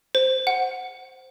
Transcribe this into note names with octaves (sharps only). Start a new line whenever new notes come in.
C5
F#5